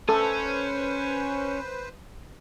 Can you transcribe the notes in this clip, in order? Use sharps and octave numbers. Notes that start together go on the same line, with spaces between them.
C#4 A4 B4 C5